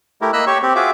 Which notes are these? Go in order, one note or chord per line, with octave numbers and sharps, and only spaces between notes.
A3 E4 G4 A#4
A#3 D#5 B5 E6 F#6
G4 C#5 C#6
C4 G4
F4 F#4 G#4 E5 D6